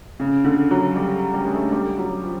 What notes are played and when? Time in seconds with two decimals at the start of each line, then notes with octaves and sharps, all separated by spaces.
0.20 C#3
0.44 D3
0.71 F#3
0.96 G3
1.34 G3
1.46 G#3
1.53 A3
1.72 G3
1.98 F#3
2.23 F3